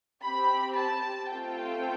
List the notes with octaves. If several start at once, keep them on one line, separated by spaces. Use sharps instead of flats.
C4 G4 B5
A5
A3 C4 F4 A4 G5